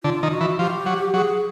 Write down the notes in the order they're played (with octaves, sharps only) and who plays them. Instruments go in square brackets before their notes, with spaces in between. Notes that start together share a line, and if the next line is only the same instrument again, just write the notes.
[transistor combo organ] D3 [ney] F4
[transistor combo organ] D#3
[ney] F#4
[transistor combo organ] E3
[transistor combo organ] F3 [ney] G4
[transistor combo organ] F#3
[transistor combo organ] F#3 [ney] G#4